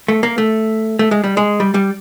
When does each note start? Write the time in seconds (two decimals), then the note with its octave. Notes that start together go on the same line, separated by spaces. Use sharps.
0.08 A3
0.23 A#3
0.38 A3
0.99 A3
1.11 G#3
1.24 G3
1.37 G#3
1.60 G3
1.74 G3